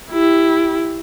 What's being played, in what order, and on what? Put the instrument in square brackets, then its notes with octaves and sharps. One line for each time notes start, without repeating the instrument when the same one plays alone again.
[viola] E4 G4